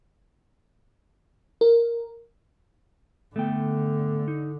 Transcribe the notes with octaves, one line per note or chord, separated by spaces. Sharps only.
A#4
D3 A3 B3 G5
D#4